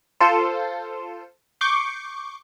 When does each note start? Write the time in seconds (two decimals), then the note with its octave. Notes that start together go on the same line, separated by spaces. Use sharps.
0.21 F4 A4 C5
1.61 C#6 D6 G6 C7 C#7